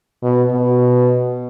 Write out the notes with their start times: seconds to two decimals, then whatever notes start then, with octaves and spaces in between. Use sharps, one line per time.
0.23 B2
0.52 B2